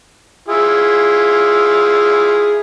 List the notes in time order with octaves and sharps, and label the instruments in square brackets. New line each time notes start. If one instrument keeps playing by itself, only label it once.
[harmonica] E4 F4 G#4